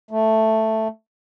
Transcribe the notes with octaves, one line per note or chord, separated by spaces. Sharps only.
A3